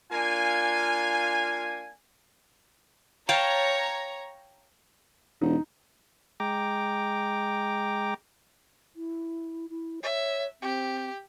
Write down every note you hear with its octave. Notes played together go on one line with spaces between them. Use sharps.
A#3 D4 F4 G#5
C#5 F5 G5 A5 A#5
E1 D#4
G#3 G5 A#5 D6
E4
E4
C#5 E5
C4 G4